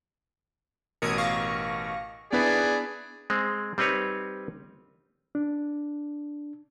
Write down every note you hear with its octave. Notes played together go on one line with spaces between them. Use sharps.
A1 B2 A#4 D#6 G#6 C#7
F5 C#6 A#6
B3 D4 E4 G#4 B4 D5
G#3 C4
G3 C4 D#4 B4 C#5
D4